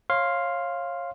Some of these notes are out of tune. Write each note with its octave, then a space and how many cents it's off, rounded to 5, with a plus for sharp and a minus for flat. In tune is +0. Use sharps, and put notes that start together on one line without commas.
C#5 -25 F5 +0 C6 +0